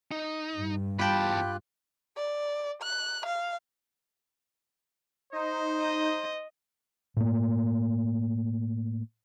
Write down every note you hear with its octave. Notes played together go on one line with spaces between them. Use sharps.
D#4
G2
E2 F4 G4 G5 A5 B5 F#6
D5
F#6
F5
D#4 C5
D#5
A2 A#3